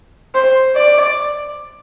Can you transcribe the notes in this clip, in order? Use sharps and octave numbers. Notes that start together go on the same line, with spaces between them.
C5
D5